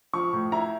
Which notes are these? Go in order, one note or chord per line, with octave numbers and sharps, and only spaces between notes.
F3 C#6
A2
E4 A#5